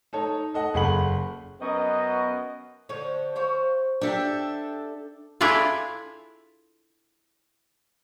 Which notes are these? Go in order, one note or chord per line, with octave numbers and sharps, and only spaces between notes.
D#4 A4 C#5
A4 D#5 F#5
F#1 G#4 A4 F#5 B5 F#7
F#2 B3 F#4 D#5
D3 F3 C#5
C5 C#5 F5
D4 G4 A4 E5
D4 E4 F4 G#4 A4